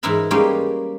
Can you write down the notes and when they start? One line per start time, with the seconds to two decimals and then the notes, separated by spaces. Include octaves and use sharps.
0.03 G#2 E3 D#4 E4 A#4 B5
0.31 G3 G#3 A#3 C#4 D#4 G4